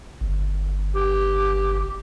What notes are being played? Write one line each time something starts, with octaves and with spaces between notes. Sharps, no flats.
G1
G4